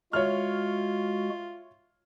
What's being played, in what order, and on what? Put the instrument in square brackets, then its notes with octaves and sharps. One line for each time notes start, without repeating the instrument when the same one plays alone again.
[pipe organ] G#3 F#4 [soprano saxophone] F4 [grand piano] C#5 E5 F6